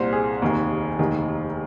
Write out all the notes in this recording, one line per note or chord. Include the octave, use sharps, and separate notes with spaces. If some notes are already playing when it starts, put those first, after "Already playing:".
Already playing: C2 A#2 C5
G#4
F1 D#2 D#3
F1 D#2 D#3